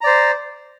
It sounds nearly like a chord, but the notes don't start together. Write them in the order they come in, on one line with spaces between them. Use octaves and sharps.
A#5 D5 C5